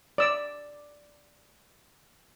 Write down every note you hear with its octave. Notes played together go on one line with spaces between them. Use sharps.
D5 E6